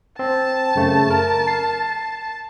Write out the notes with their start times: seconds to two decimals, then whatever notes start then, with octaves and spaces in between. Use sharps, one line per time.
0.19 C4 A5
0.76 F#2 C#3 A3
1.10 A#4
1.48 C7